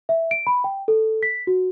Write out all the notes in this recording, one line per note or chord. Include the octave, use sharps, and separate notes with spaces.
E5
D7
B5
G5
A4
B6
F#4